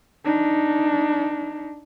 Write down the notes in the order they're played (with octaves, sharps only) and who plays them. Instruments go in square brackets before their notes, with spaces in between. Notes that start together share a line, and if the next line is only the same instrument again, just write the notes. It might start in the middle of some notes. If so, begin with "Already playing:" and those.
[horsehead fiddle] D4 D#4